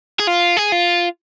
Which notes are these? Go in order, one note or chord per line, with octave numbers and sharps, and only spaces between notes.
G#4
F4
G#4
F4